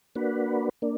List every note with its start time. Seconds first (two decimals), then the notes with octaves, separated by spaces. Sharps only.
0.15 A#3 D4 F#4 B4
0.82 A#3 D4